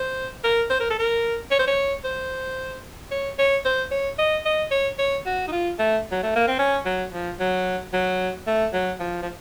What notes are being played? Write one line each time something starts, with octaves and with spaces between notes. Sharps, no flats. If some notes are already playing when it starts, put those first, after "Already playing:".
Already playing: C5
A#4
C5
A#4
A4
A#4
C#5
C5
C#5
C5
C#5
C#5
C5
C#5
D#5
D#5
C#5
C#5
F#4
D#4
F4
A3
F#3
A3
A#3
C4
C#4
F#3
F3
F#3
F#3
A3
F#3
F3
F3